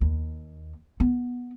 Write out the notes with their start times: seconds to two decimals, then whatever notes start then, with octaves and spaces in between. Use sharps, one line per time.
0.01 D#2
1.00 B3